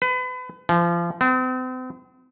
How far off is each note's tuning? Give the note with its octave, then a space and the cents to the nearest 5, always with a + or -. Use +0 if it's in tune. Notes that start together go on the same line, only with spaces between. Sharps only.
B4 +35
F3 -30
C4 -40